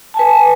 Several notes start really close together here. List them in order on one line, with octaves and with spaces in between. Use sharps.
A5 G#5 B4